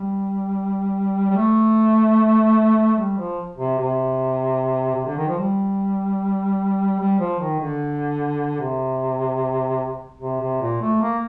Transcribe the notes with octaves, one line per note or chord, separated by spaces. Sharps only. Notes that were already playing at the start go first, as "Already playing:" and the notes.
Already playing: G3
G3
A3
G3
F3
C3
C3
C3
D3
D#3
F3
G3
G3
F3
D#3
D3
C3
C3
C3
A#2
A3
A#3